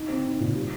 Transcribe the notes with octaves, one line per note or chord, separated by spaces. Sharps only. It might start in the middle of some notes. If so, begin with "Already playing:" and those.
Already playing: D#4
C4
D#4
A#2
G3